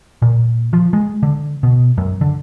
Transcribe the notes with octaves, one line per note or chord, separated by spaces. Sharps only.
A#2
F3
G#3
D3
B2
F#2
D3